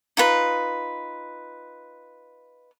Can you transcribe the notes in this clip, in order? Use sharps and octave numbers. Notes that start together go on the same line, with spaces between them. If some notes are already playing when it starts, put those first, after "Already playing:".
D#4 F4 B4